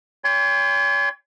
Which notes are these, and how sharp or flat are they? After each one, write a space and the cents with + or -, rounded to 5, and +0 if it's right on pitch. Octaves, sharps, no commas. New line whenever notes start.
C#5 +35 G5 +40 C6 -30